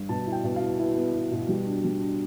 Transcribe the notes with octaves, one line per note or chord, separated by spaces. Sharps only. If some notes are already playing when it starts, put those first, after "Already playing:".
Already playing: G2
B2 A5
E4
G5
B2
E4 F5
E4 B4
B3
E4
B2
G3
D4
G3
D4